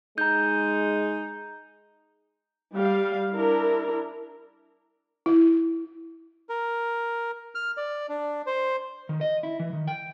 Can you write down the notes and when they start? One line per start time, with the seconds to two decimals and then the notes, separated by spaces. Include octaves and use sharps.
0.18 G#3 D#4 A#5 G6
2.75 G3 F5
3.32 D4 E4 A#4
5.26 E4
6.49 A#4
7.55 F6
7.77 D5
8.09 D4
8.47 C5
9.09 D#3
9.21 D#5
9.43 E4
9.60 E3
9.73 D#3
9.87 G5